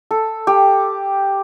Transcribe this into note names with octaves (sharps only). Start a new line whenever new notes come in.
A4
G4